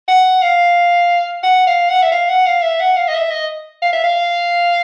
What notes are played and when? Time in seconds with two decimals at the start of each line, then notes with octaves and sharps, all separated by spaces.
0.08 F#5
0.42 F5
1.43 F#5
1.67 F5
1.89 F#5
2.02 E5
2.12 F5
2.29 F#5
2.46 F5
2.62 E5
2.80 F#5
2.96 F5
3.08 D#5
3.14 E5
3.31 D#5
3.82 F5
3.93 E5
4.04 F5